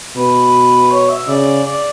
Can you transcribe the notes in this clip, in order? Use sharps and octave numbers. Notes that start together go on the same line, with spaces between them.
B2 B4
C#5
E5
C#3 D5
D5